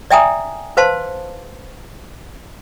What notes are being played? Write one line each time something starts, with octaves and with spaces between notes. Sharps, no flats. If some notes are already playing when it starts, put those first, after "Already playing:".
D5 E5 G5 G#5 A#5 D#6
B4 C5 F5 A5 C6